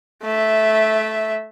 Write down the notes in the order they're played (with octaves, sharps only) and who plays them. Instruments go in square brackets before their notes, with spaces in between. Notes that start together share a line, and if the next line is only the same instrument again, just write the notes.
[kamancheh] A3 E5